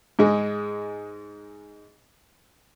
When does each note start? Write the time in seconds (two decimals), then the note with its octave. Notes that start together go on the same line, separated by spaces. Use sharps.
0.19 G#2 G#3